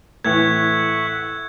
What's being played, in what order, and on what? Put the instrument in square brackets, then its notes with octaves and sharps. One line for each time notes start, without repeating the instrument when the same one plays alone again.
[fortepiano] A2 E3 [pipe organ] E5 F#5 C#6 [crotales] G#6